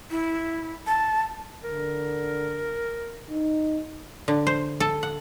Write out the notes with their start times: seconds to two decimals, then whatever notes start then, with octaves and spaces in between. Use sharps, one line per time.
0.11 E4
0.87 A5
1.64 D3 A#4
3.30 D#4
4.28 D3
4.47 C5
4.80 A4
5.03 F#5